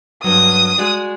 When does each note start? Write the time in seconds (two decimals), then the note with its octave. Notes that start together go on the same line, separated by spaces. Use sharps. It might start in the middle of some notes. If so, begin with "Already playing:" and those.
0.24 G2 F#3 D#6
0.78 G#3 F#4 D5